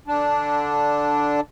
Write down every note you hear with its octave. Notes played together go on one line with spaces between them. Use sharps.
D3 D4